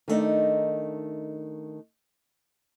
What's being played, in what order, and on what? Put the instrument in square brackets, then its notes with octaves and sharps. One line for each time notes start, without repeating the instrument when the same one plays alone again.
[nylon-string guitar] D#3 A3 D4 D#4